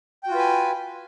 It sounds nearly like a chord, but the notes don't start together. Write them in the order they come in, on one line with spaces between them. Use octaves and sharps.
G5 F#4 F4 B4 G#5